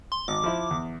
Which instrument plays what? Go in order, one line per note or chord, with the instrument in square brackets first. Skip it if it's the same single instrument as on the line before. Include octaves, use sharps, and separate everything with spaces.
[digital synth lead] C6
[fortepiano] G#1 [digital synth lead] D6
[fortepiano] F3 E4
E2